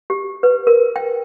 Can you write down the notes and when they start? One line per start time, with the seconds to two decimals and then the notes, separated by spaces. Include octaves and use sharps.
0.10 G4
0.43 B4
0.67 A#4
0.96 G5